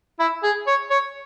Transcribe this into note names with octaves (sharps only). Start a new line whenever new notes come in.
E4
G#4
C#5
C#5